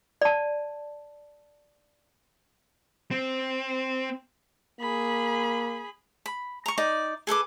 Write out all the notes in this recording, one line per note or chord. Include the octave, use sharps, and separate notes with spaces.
D5 A5
C4
A#3 G#4 B5
B5
A#5 C#6
D#4 D5
G#4 A4 B4 D6